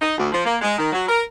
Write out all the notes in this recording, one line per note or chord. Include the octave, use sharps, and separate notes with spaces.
D#4
D2
F3
A#3
G#3
D#3
F#3
A#4